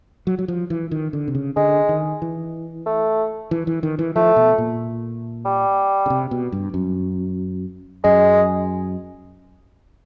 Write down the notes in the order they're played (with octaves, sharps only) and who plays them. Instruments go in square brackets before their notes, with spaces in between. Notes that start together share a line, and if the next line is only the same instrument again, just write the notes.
[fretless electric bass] F#3
F#3
F3
E3
D#3
D3
C3
C#3
[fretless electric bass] D3 [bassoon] G#3
[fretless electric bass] D#3
E3
[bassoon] A3
[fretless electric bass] E3
E3
D#3
E3
[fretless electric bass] F3 [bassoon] A3
[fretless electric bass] B2
A#2
[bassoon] G3
[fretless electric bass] C#3
C3
B2
G2
F#2
[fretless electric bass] F#2 [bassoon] G#3